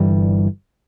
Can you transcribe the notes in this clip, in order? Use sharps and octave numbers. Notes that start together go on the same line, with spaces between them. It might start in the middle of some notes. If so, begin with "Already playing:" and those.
Already playing: G1 G2 E3 G3